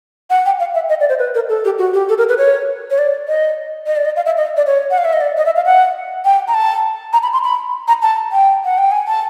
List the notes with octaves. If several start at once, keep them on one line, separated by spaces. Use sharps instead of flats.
F#5
G5
F5
E5
D#5
D5
C5
B4
A#4
A4
G4
F#4
G4
A4
A#4
B4
C#5
C#5
D5
D#5
D#5
D5
D#5
F5
E5
D#5
D5
C#5
F#5
F5
E5
D#5
D5
D#5
E5
F5
F#5
G5
A#5
A5
A#5
B5
C6
B5
A#5
A5
G5
F#5
G5
G#5
A5